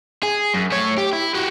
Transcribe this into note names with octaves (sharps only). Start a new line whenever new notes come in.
G#4
F#2
A3 C#5
G4
E4
F#4 G4